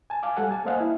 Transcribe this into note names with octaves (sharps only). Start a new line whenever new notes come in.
G#5 A5
F5 G#5 D6
G3 A4 F#5
G#5 A5
A#3 C5 D#5 F5 F#5
E4